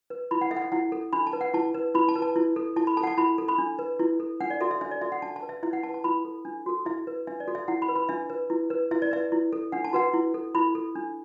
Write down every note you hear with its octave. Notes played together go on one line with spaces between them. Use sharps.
B4
E4 B5
F#5
A4 E5
F#5
E5
E4 F#5
A4
D4 B5
A5
B4
F#5
E4 A5
B4
E4 B5
A5
B4
A5
E4
A4
E4 A5
B5
A4 A5
F#5
A5
E4 B5
A4
B5
D4
B4
E4
A4
D4 F#5
D5
F#4 A4 E5
E5
D4 E5
D5
F#4 A4 E5
F#5
D4 A5
A5
B4
E5
E4 E5
F#5
B4 A5
A5
E4 B5
A4
D4
F#4 A4
E4 E5
B4
D4 E5
D5
F#4 A4
E5
E4 F#5
B5
B4
B5
D4 E5
B4
E4
B4
E4 E5
D5
B4 E5
E4
A4
D4 F#5
A5
F#4 B4 F#5
E4
A4
E4 B5
A4
D4